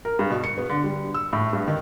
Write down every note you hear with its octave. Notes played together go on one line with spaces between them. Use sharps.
A#4
G2
B2
C#7
B3
D3
G3
E6
A2
G2
D#3